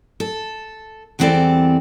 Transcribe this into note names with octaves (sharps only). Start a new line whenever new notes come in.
A4
E2 E3 G3 C4 A4 D5